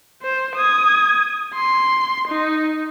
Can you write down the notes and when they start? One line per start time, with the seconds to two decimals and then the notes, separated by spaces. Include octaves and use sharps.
0.22 C5
0.56 D#6 G#6
1.55 C6
2.28 D#4